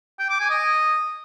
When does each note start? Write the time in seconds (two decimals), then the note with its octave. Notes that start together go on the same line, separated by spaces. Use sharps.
0.20 G5
0.30 D6
0.40 G#5
0.50 D#5